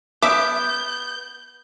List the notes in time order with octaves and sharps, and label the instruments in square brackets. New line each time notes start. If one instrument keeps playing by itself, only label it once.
[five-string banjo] B3 [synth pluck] E5 D6 [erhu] G6